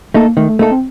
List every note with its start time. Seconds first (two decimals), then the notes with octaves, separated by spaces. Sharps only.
0.14 A3 A#3 D#4 A4
0.37 D#3 A3
0.48 A3
0.59 A3 A#3 D#4 A4
0.71 C4